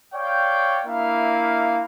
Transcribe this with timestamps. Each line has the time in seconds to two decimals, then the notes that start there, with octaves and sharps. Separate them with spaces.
0.14 C#5 D5 F5 G5
0.86 A#3 D4 E4 E5 F5